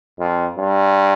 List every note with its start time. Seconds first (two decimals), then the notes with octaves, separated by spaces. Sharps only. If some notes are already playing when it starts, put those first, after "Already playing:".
0.19 F2
0.58 G2